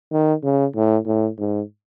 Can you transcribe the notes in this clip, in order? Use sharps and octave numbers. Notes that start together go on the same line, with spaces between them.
D#3
C#3
A2
A2
G#2